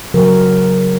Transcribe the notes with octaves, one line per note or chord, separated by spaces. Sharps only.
C#3 F#3 A#4